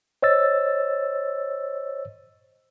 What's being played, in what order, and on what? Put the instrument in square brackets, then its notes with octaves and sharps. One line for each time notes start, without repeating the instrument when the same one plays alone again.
[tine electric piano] C5 C#5 D#5 E6 A6